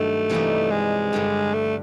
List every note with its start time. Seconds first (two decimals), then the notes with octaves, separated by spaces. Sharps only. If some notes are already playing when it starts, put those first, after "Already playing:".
Already playing: G2 D#3 F#3 A3
0.29 C3 E3 G3 A#3 D#4
0.71 G#3
1.13 G2 D3 G3
1.54 A3